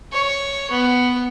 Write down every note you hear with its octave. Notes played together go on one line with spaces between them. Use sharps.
C#5
B3